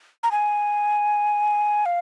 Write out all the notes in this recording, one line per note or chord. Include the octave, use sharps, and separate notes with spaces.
A#5
G#5
F5